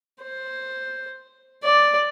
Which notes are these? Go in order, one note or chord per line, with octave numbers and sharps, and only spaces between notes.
C5
D5